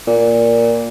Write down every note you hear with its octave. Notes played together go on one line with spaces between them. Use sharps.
A#2